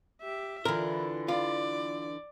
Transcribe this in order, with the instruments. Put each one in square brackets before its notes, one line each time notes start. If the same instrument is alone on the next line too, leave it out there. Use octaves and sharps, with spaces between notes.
[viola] G4 E5
[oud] D3 E3 [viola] F4 [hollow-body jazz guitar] A#4
[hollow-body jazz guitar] F4 [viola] D5